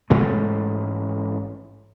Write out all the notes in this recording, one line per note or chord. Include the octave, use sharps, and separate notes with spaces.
A1 G#2 G#3 A3